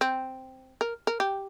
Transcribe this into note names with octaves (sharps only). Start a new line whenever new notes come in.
C4
A#4
A#4
G4